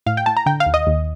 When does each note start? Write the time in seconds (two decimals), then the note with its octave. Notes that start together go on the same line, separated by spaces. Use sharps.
0.06 A2 F5
0.17 G5
0.26 A2 A5
0.37 A#5
0.46 D3 G5
0.60 F5
0.66 D#2
0.74 D#5
0.87 D#2